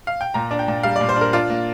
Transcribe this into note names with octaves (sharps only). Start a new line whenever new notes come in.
F5
G5
A#2 A#5
D4
G5
A#2
G3 F5
D5
A#2
C5
D4 A#4
D4 F4
A#3